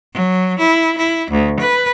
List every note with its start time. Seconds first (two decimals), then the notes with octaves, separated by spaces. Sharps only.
0.13 F#3
0.59 E4
0.98 E4
1.31 D2
1.60 B4